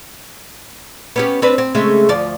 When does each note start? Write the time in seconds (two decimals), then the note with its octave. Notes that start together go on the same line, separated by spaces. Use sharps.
1.16 B3 C#4 G4
1.42 C4 D4 B4
1.58 C4
1.74 C#3 G#3 A3
2.09 D2 F3 D5